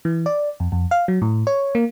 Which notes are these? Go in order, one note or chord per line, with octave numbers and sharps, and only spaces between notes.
E3
D5
F2
F2
F5
F#3
A2
C#5
A#3